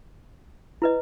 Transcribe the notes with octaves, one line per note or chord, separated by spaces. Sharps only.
E4 B4 D#5